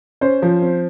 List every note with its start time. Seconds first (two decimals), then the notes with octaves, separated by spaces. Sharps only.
0.21 C#4 C5
0.42 F3
0.62 C4